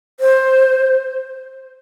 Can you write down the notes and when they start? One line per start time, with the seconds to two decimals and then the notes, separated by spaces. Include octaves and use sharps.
0.20 C5